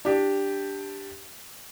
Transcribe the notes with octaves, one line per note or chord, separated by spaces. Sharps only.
D4 G4